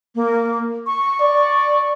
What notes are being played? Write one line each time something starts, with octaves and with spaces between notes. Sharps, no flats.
A#3
C#6
D5